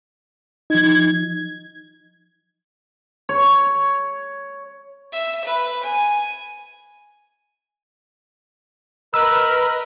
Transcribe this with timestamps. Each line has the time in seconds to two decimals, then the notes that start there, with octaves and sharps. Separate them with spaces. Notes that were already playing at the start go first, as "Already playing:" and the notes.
0.70 F3 D#4 G#6
3.29 C#5
5.12 E5
5.45 B4
5.83 G#5
9.14 A#4 B4 D#5 B5 E6